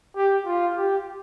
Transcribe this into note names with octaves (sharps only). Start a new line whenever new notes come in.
G4
F4
G4